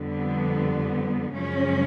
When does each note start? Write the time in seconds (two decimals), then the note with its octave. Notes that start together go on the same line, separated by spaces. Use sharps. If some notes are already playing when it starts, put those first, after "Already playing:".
Already playing: F2 D3 G3 B3
1.33 F#2 C#3 F3 G#3 C#4